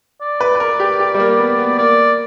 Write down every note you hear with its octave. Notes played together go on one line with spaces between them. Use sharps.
D5
B4
B4
A#4
G4
G4
G3
A#3
B3
B3
A#3 D5